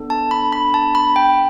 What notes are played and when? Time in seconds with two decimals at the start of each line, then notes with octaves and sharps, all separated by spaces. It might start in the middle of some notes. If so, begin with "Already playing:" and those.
Already playing: B3 D4 A4
0.10 A5
0.31 B5
0.52 B5
0.74 A5
0.95 B5
1.16 G5